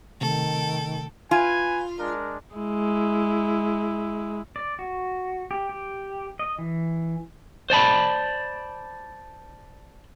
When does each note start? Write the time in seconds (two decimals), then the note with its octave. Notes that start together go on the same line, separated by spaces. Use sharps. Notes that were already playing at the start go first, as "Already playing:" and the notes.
0.21 C3 D#3 A3 A4 G5
1.31 F4 B4 G#5
1.99 G#3 D4 A#4
2.55 G#3 E4
4.56 D5
4.79 F#4
5.51 G4
5.69 G4
6.39 D#5
6.59 E3
7.70 C5 D5 A5 B5